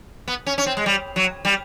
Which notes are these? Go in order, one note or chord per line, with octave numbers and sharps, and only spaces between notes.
B3
C#4
C#4
C4
G#3
G3
F#3
G3